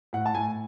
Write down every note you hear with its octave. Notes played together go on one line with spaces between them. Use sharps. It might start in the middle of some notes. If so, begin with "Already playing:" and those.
A2 F#5
A5
A2 G#5